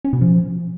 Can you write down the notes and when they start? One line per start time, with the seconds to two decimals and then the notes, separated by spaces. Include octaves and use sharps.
0.05 C#4
0.13 B2
0.21 F3